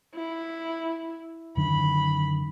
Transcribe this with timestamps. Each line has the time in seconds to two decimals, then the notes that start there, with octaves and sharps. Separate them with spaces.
0.15 E4
1.57 F#2 D3 D#3 B5